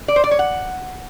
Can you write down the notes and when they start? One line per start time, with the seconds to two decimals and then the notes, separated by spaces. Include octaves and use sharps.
0.08 D5
0.16 C5
0.24 D5
0.31 C#5
0.39 F#5